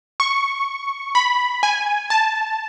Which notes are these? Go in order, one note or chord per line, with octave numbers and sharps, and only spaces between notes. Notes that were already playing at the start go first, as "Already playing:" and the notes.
C#6
B5
G#5
A5